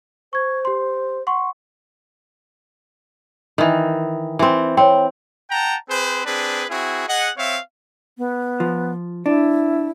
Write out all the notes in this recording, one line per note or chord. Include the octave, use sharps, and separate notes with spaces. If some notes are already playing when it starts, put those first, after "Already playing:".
C5 C#6 G#6
G4 C6
F#5 C6 C#6
D#3 E3
E3 C4
C4 C#5 G5
F#5 G5 A5 A#5
C4 G#4 B4 C5
C4 D4 G#4 B4
C4 E4 F#4 G#4
G#4 D#5 F#5
C4 C#5 E5 F5
B3
F3
D4 E4